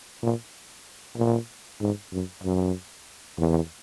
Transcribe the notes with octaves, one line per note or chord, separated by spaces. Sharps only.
A#2
A#2
G#2
F#2
F#2
E2